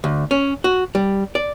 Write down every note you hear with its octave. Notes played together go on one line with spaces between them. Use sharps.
D2
C#4
F#4
G3
D5